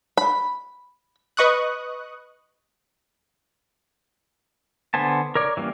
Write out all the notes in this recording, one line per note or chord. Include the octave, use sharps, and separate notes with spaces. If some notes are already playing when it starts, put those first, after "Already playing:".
B5
B4 D#5 C#6 D#6 F#6
D3 B3 C5 G#5 A5
A#4 C#5 D5
E3 G3 A#3 C#4